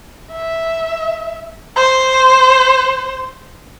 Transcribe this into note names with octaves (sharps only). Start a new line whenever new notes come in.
E5
C5